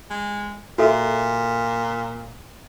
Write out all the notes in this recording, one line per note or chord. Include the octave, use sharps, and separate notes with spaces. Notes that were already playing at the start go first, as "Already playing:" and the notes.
G#3
A#2 F#4 A4 E5